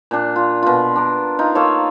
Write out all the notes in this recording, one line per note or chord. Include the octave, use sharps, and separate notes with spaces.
A#2 D4
F4
B2 F4
D4 A#4
D#4 F4
A#3 F4 A4 C#5